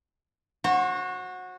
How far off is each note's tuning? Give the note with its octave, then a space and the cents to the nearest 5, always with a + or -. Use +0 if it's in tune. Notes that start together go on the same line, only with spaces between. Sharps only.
F#4 -15 C5 +40